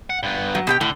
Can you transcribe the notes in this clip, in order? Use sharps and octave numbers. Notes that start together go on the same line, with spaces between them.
F#5
G2 B3
F#3
B2 G4 G5
A2 D3